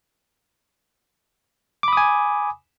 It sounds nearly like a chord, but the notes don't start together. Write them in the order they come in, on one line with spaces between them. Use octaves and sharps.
D6 B5 D#6 G#5